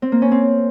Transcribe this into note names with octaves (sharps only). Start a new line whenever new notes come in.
C4
A#3
C#4
C4